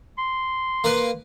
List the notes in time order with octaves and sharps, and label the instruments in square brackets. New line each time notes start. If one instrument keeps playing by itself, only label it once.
[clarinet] C6
[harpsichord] A#3 A#4 B4